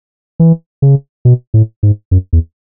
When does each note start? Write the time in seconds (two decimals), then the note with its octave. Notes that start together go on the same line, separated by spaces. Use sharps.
0.40 E3
0.82 C#3
1.25 B2
1.54 A2
1.83 G#2
2.11 F#2
2.33 E2